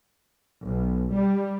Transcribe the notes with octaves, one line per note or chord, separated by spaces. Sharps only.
B1
G3